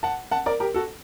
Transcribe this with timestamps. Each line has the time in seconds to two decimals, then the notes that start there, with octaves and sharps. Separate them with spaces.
0.03 F#5 A5
0.31 F#5 A5
0.46 A#4 D5
0.60 G4 A#4
0.74 F#4 A4